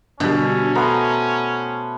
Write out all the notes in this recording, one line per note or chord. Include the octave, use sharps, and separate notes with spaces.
B2 D3 G3 C#4
A3 B3 C5 A#5